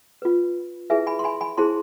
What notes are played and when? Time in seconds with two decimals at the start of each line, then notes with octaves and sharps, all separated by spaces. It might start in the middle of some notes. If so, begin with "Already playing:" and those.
0.22 F4 B4
0.90 E4 G#4 B4 E5 G#5
1.07 G#5 B5
1.19 C6
1.24 G#5 B5
1.41 G#5 B5
1.57 E4 G#4 C5 A5 C6